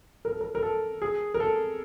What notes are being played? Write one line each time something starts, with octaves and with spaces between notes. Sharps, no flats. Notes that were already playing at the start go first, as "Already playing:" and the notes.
A#4
A4
A#4
A#4
A4
G#4
A#4
A4